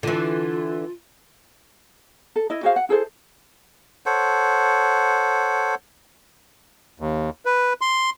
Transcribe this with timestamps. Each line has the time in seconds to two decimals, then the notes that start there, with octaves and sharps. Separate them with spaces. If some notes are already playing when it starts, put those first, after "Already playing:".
0.03 D3 E3 F4
2.36 A4
2.50 E4 D#5
2.63 F#4 G#4 C5 F5
2.76 F#5
2.89 E4 G#4 A4 C5
4.06 A4 C5 C#5 F#5
7.00 D#2
7.45 B4
7.81 C6